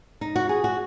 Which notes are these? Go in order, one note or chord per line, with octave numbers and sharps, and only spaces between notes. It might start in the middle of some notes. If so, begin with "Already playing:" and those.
D#4
F#4
G#4
F#4